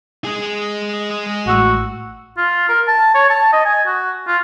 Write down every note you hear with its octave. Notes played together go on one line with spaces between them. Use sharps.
G#3 G#4
A1 A2 F#4 E6
F4
A#4
A5
C#5
A5
D#5
G#5
F#4
F4